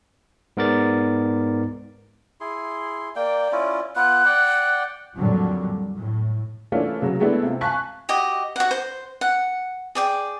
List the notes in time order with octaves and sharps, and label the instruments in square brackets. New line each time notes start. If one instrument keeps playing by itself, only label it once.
[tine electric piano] G#2 B3 A#4 D5 A6
[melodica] E4 G#4 C6
[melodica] A#3 G5 [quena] D5
[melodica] C#4 E4 F4
[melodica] B3 F4 [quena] F#6
[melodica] D5 F#5 G5
[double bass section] F2 A#2 D3 F#3 G3
A2
[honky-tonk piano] E3 A3 A#3 C#4 D4 F4
C#3 F#3
G#3 A3 B3 D4 E4
C3 F4
F5 G#5 A5 C#6 F#6 B6
[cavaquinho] F#4 G4 D#5
F#4 F#5
C5
F#5
G#4 D5 G5